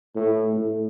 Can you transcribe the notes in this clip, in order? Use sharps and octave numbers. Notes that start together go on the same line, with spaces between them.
A2
A2